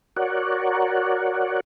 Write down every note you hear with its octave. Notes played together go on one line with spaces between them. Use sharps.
F#4 A#4 C#5 D5 F#5